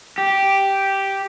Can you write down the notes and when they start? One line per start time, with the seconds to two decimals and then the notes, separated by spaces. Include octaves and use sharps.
0.18 G4